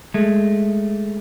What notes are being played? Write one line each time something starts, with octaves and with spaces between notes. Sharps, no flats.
G#3 A3